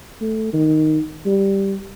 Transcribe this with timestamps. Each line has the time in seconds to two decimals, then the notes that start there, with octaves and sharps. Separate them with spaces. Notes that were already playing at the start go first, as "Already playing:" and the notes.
0.21 A3
0.53 D#3
1.26 G3